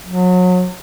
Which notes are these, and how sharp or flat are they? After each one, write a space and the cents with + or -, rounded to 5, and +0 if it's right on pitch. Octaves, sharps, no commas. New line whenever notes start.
F#3 -30